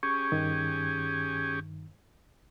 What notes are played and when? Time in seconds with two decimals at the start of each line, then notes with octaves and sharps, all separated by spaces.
0.03 C#4 G4 G#4 C#6
0.32 G2 D#3